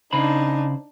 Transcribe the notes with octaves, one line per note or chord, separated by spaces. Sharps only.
C#3 D4 D#4 C5 B5